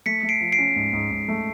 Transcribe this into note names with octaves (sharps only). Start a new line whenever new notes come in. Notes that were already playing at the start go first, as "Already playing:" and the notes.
A3 B6 C#7
A3
C7 D7
F3
C7 D7
C#4
G#2
G#2
G#2
A3